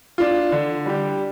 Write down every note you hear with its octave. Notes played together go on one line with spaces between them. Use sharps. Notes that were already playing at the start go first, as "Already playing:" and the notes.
D4 F4
D3
G3 D4 G4